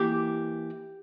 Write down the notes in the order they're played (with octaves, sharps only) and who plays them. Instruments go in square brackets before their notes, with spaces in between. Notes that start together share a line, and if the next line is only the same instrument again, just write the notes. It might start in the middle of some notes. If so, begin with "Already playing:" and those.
Already playing: [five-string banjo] E3 A#3 E4 G4